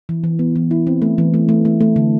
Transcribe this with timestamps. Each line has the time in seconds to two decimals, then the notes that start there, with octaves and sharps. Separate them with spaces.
0.09 E3
0.24 E3
0.39 B3
0.56 E3
0.71 E4
0.87 C4
1.02 A3
1.18 E3
1.34 A3
1.49 A3
1.65 A3
1.81 A3
1.96 D3